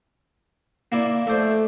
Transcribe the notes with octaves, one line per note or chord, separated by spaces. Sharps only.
A#3 E4 D5
A3 C5 D5 E5